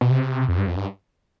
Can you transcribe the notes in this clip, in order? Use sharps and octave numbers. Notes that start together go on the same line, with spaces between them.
B2
C3
F2
G2
F2
G2